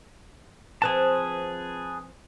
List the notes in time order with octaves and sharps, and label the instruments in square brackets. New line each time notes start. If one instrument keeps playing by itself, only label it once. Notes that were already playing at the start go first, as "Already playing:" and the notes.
[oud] F3 C4 C5 [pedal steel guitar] G#4 B4 A5